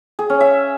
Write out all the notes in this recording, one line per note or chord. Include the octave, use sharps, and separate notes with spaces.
G#4
C#4
E5